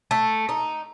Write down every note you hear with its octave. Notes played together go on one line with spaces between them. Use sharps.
A3
D#4